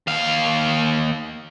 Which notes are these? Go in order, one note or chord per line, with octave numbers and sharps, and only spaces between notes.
D#2 F5